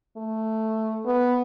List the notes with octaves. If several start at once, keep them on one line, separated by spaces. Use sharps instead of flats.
A3
B3